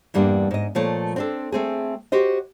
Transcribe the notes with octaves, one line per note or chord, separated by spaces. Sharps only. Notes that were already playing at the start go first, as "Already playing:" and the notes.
E2 G2 G3 A#3 D4
G#2 D#5
A#2 F3 A3 C#5
C4 D4 A4
A3 C4 G#4
F#4 G4 C5 D#5